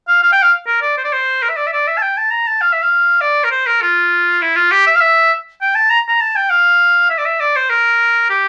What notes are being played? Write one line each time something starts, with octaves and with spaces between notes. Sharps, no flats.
F5
F5
G5
F5
A#4
D5
C5
D5
C5
A#4
E5
D5
E5
D5
E5
A5
G5
A5
A#5
A5
F5
E5
F5
D5
A#4
C5
A#4
F4
E4
F4
G4
E5
F5
E5
G5
A5
A#5
A#5
A5
G5
F5
E5
D5
E5
D5
C5
A#4
G4